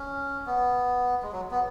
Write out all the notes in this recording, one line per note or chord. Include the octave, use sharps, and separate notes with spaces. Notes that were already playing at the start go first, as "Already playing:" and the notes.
Already playing: C#4
B3
G#3
F#3
B3